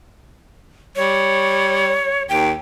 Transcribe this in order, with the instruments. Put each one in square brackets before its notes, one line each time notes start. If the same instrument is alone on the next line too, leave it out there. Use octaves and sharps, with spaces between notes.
[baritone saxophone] G3 [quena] C#5
[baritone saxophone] D#2 [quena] G5